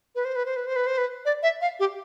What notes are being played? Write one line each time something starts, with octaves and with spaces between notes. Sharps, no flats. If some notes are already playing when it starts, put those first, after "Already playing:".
B4
C5
B4
C5
B4
C5
B4
C5
B4
D5
E5
F5
G4